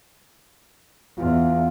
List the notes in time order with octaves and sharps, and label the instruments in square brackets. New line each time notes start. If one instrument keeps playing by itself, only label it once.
[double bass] E2 [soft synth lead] F4